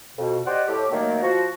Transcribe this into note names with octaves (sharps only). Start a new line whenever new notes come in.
F2 B2
G4 C5 D5 D#5 F#5
A2 G4
D#3 F#3 A3 A#3
F3 F#4